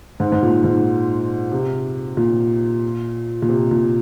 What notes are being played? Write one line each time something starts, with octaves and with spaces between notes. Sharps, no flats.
G#2
G#2
A#2
G#2
C3
A#2
A#2
C3
A#2